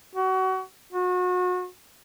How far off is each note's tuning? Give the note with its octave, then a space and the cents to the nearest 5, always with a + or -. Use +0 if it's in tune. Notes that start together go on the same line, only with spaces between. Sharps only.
F#4 +30
F#4 -35